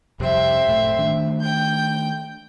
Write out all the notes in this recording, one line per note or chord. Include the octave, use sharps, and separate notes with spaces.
F2 C3 G3 C4 E5
F#1 A2 A3
D#3 A3 D4
G5 G6